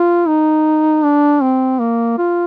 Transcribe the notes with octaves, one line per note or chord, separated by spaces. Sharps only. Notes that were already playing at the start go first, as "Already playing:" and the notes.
Already playing: F4
D#4
D4
C4
A#3
F4